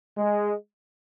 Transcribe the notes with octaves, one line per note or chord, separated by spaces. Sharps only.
G#3